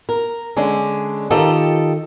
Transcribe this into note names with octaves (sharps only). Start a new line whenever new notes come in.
A#4
D3 G#3 C#4 D4
D#3 F4 G4 A4 D#5